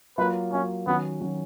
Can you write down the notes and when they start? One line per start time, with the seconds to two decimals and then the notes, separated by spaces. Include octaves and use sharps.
0.18 F#3 A#3 F4 B4
0.52 F#3 A#3 C#4 F4
0.86 D#3 F#3 B3 C#4 F#4
1.21 D#3 F#3 C#4 F#4